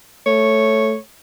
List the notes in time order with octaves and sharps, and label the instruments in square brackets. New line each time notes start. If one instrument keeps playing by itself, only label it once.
[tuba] A3 [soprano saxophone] C#5